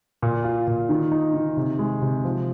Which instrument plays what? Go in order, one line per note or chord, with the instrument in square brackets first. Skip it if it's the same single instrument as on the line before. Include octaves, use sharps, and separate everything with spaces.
[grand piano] A#2
F4
A#2
D#3
D#4
D#3
C3
G#3
C3
F3